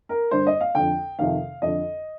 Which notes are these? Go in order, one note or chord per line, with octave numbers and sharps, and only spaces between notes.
A#4
G2 D3 C5
D#5
F5
F2 D3 G5
F2 C3 D#3 F5
F2 D3 D#5